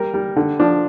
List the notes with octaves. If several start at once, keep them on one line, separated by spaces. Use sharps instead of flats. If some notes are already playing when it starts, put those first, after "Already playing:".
Already playing: G3 A#4
G3
D3
F3 D4